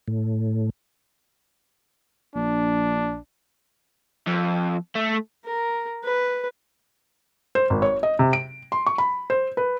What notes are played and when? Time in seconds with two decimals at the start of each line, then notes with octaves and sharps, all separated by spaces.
0.08 A2
2.35 A#1 D4
4.27 F2
4.95 A3
5.45 A#4
6.04 B4
7.55 C5
7.70 G#1
7.82 C#5
8.03 D#5
8.19 C3
8.33 D7
8.72 C6
8.87 C#6
8.98 B5
9.30 C5
9.57 B4